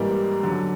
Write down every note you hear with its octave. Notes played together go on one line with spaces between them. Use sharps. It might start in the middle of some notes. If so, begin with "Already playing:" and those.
Already playing: G#2 E3 G3 A#3
F#2 D3 F#3